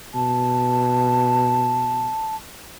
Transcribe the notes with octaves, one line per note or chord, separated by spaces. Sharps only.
B2 A5